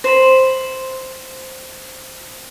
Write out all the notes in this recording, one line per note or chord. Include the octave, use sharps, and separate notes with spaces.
C5 B5